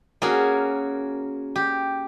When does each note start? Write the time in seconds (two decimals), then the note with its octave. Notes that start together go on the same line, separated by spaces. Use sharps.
0.22 A#3 C#4 F#4 G#4 A#4
1.56 G4